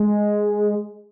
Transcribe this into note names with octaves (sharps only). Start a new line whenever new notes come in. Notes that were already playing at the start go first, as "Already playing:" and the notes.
Already playing: G#3